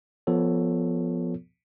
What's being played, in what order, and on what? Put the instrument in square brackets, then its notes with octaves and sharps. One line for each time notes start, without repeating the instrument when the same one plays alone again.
[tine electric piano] F3 B3 F4 A4 C#5